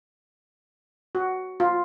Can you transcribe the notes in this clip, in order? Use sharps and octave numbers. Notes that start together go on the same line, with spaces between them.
F#4
F4